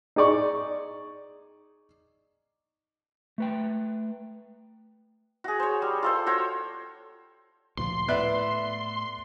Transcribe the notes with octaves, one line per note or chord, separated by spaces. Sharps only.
D#4 G#4 D5 C#6
A3 B4 G5
F#4 G#4
C5 C#5
G3
F4 A4 C5
F#4 C5 C#5
D2 A#2 F3 C6
A2 B3 B4 D5 E5